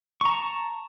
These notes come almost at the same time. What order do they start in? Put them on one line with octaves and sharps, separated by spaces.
C#6 A#5 A5